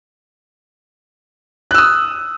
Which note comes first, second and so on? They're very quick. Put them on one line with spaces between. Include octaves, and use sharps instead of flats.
F#6 E6 D#6